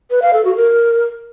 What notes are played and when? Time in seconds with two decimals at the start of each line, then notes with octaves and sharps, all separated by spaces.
0.11 B4
0.22 F5
0.33 A4
0.45 F#4
0.56 A#4